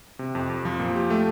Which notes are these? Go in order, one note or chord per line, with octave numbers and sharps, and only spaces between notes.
C3
F2
F2
F3
A#2
G4
A3